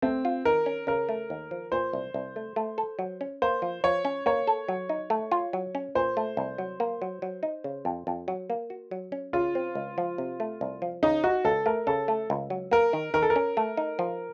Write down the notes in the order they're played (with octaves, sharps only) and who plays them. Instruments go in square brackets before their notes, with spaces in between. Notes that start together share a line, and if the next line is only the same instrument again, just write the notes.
[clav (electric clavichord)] A3 [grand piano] C4
[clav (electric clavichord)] F4
[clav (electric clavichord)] D#3 [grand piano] A#4
[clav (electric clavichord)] C#4
[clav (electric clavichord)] C#3 [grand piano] A#4
[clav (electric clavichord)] A3
D#2
F3
[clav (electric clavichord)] A#2 [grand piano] C5
[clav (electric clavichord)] C2
C2
A3
A3
A4
F#3
C#4
[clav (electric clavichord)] A#3 [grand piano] C5
[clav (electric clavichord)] F3
[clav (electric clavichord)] F3 [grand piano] C#5
[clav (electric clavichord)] C#4
[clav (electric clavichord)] A#3 [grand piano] C#5
[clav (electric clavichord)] A4
F#3
D#4
A3
F4
F#3
C#4
[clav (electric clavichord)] A#2 [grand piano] C5
[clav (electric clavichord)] A3
C2
F#3
A#3
F#3
F#3
D#4
C#3
F2
F2
F#3
A#3
F#4
F#3
C#4
[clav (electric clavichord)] C#3 [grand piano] F4
[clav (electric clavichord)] C4
C#2
F3
C3
A3
C2
F3
[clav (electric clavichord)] C#3 [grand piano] D#4
[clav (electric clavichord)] D#4 [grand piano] F#4
[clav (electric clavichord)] C#2 [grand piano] A4
[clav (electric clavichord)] A3 [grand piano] A#4
[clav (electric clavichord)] C#3 [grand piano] A4
[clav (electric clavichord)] A3
C#2
F#3
[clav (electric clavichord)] A#3 [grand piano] A#4
[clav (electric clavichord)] D#3
[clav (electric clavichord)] D#3 [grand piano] A#4
[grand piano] A4
A#4
[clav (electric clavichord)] C#4
A3
D#4
F3